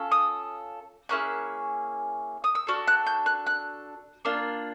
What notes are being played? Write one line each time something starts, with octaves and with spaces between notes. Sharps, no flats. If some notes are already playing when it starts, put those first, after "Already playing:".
Already playing: C#4 F4 A4
D#6
A#3 C#4 E4 G#4 F#6
D#6
E6
D4 F#4 A4 F6
F#6
G6
F#6
F#6
A#3 D4 F4